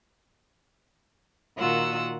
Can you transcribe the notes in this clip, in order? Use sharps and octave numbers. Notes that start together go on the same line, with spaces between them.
A#2 D#3 F4 F#4 F#5 E6